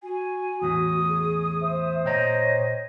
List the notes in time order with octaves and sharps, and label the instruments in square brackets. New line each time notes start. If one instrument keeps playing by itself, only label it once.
[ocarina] F#4 [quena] G#5
[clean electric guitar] E2 A2 [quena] D#6
[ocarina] G#4
[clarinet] C5 [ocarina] E5
[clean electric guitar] A#2 G5 A#5 [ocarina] C#5 [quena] D#5